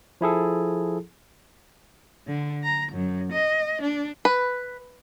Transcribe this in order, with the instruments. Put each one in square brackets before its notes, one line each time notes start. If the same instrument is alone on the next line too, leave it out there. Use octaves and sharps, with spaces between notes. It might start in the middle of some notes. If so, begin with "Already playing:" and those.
[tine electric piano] F3 E4 G#4 A4
[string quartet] D3
A#5
F#2
D#5
D4
[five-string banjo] B4